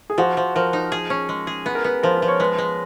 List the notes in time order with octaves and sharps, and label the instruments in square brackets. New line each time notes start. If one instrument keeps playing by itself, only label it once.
[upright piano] G#4
[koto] F3 [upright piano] F#4
[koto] F3
[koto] F3 [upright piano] A#4
[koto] D#4
G#4
C#4
G#3
G#4
[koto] B3 [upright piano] B4
[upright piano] A#4
[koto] B3 [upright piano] B4
[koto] F3 [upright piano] A#4
[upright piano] B4
[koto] F3
[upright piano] C#5
[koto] G#3 [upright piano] B4
[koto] G#3